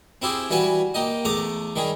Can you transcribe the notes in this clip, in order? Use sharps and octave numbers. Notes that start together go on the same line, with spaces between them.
C4 E4 G4 G#4
E3 G3 F#4 B4 G#5
A#3 G4 D#5
E2 A3 A#5 D6 D#6
D#3 G3 G#4